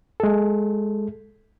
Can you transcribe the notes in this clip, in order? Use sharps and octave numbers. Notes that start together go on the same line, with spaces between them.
G#3 A4